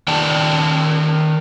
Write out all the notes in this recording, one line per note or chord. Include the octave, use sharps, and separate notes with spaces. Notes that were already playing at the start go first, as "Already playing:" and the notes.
D#3 D5 G5 A5